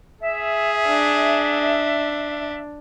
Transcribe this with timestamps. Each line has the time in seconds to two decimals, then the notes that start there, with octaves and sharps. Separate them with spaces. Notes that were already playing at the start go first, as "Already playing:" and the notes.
0.21 G#4 E5
0.88 D4